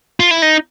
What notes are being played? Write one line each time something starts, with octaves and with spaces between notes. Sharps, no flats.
F4
E4
D#4